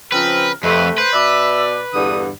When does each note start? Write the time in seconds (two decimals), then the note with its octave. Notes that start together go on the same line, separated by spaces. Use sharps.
0.12 C#3 F3 C4 A#4 B4
0.63 F2 C3 A3 B4
0.98 B4 C5
1.13 B2 D5 E5
1.93 E2 G2 D3 D#6